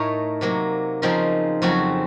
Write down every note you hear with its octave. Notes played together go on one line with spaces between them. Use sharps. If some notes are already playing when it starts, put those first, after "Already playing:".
Already playing: A2 A3 D#4 A#4 C#5
C3 F#3 A#3
C#3 F3 C4 D#4 A#4
F2 C#3 F#3 C4 F#4